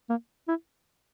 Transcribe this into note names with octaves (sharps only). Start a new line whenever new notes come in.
A#3
E4